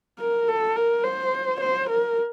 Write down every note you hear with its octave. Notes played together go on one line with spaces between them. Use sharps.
A#4
A4
A#4
C5
C5
A#4